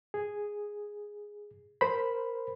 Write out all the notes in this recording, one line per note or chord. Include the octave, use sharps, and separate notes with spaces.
G#4
A#4 C5 B5